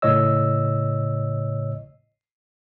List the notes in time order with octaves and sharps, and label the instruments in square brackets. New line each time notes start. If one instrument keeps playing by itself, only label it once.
[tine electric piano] G#1 A2 C#3 C#5 D#5 E6